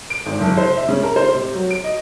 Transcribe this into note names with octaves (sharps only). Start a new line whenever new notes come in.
D7
G#1
F#1
C5
E5
C#3
A#4
C5
C3
F#3
D7
D#5